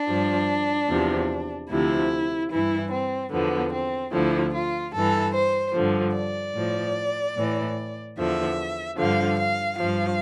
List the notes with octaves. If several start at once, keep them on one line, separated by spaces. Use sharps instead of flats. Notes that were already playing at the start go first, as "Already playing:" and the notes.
Already playing: D4
G2 F3
E2 C3 F3
D2 C3 F3 E4
G2 E3 E4
C4
E2 D3 F3 B3
C4
D2 D3 F3 E4
F4
G2 E3 A4
C5
G2 D3 F3
D5
A2 F3
A2 E3
E2 D3 F3 E5
G2 D3 F3 F5
F5
G2 F3 F5